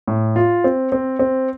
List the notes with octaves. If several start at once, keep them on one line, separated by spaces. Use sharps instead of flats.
A2
F4
C4
C4
C4